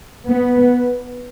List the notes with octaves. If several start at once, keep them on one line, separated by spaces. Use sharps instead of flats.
B3